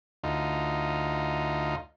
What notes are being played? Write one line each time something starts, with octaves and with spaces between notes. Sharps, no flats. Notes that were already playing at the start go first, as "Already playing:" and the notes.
D2 D#4 F4